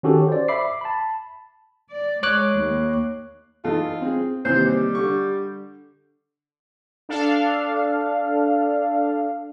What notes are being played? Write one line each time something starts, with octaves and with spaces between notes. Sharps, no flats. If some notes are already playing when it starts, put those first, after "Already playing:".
D#3 C#4 F#4 G4 A4
C5 D5
E5 B5 D6 C7
A5 B5
D5
G#3 C#5 D6 F#6
D#2 A#3
E2 D#4 F4 A4
C4 G#4
D#2 C3 E3 C5
G3
D3 C#6
D4 A4 F5